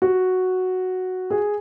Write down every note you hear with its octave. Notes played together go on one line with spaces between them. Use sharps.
F#4
G#4